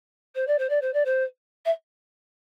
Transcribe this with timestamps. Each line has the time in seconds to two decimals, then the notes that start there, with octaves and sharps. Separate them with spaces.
0.35 C5
0.47 D5
0.58 C5
0.69 D5
0.81 C5
0.93 D5
1.05 C5
1.65 E5